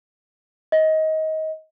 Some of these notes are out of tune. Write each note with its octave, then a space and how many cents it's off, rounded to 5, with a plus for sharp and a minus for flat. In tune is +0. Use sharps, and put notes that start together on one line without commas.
D#5 +20